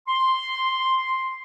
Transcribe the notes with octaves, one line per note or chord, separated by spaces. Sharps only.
C6